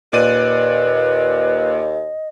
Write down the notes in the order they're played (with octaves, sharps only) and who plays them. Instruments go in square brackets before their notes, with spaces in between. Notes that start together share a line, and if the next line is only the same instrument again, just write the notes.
[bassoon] D#2 [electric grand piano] A#2 D5 D#7 [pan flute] B4 [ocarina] D#5